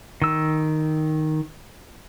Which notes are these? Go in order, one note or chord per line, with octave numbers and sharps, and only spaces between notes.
D#3 E6